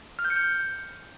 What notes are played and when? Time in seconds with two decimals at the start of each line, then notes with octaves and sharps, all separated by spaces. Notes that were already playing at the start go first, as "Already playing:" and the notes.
0.19 F6
0.24 G6
0.30 C#7
0.36 G6